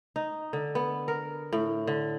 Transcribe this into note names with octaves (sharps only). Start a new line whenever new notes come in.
D#4
D3
B3
A#4
A2
D3